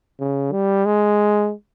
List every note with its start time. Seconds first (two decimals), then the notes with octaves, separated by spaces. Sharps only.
0.20 C#3
0.52 G3
0.85 G#3